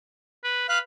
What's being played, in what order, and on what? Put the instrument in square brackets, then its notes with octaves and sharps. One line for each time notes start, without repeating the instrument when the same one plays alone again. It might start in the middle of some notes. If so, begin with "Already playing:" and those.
[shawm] B4
[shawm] B4 [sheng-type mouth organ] F5 F#6